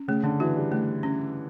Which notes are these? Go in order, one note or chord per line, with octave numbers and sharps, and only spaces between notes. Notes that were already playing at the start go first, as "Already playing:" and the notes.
Already playing: C#4
C#3 A3
D3
E3 F#4
G3
A3
C#4